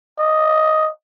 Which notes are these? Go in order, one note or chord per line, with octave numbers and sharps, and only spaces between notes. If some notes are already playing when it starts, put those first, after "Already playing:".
D#5